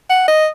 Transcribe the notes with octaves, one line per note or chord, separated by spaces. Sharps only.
F#5
D#5